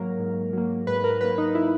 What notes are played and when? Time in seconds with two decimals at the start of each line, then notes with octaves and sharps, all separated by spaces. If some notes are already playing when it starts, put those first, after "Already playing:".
Already playing: G#2 F#3 A#3 A#4
0.19 G#2
0.53 F#3 A#3
0.87 G#2 B4
1.04 A#4
1.21 F#3 A#3 B4
1.38 D#4
1.55 E4